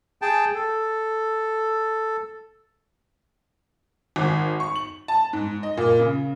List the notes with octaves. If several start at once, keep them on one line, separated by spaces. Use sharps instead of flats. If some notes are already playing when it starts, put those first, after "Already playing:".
G#4 G5 A5
A4
G#1
C#6
F#7
A5
G#2
D#5
A#2
C#3